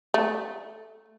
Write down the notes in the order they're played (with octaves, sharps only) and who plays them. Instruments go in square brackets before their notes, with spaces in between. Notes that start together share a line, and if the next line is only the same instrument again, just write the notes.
[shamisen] A3